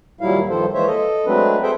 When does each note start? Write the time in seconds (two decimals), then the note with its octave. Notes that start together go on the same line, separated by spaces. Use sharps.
0.21 D#2 A#2 F#3 G3 E4 F5
0.49 G2 D#3 F3 A4 C5
0.74 E3 G#3 A#3 C5 C#5 E5
0.87 A4 D#5
1.26 F#3 G#3 A3 C4 D4 B4
1.63 G#4 A4 C5 E5 G5